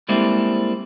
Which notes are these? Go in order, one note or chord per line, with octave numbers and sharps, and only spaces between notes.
G3 G#3 A#3 C4 E4 A4